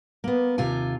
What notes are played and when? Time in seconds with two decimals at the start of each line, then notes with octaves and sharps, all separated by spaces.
0.24 A#3 B3
0.58 D#2 C3 F4 G#5